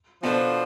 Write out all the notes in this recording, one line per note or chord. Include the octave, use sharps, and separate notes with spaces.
B2 F3 B3 D4 A4 C5